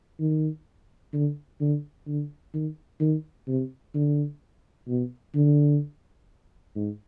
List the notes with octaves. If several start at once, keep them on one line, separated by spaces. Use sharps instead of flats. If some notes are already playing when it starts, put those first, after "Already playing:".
D#3
D3
D3
D3
D#3
D#3
C3
D3
B2
D3
G#2